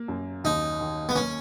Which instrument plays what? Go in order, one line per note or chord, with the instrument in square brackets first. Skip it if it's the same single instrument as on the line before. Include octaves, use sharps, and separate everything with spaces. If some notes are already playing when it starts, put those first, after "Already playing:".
Already playing: [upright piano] A#3
F#2
[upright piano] D#2 [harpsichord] D#4
[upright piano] D#3
[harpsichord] B3
[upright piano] A#3 [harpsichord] C#4